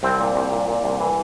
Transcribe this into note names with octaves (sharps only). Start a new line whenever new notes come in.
C2 C4
A#2
C2
A#2
A#2
C2
E3